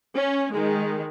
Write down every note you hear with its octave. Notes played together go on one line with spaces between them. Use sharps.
C#4
D#3 G#3